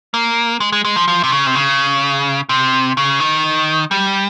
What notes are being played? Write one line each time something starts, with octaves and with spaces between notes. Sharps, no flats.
A#3
G#3
G#3
G#3
F3
F3
C3
C#3
C3
C#3
C3
C#3
D#3
G3